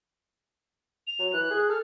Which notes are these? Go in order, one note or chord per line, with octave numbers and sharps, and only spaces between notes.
F7
F#3
E3 F#6
G#4
A4 F6